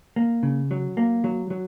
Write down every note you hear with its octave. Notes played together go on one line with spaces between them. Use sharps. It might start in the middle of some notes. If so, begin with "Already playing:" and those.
A#3
C#3
F#3
A#3
F#3
F#3